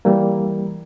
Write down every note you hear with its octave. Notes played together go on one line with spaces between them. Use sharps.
E3 G3 A#3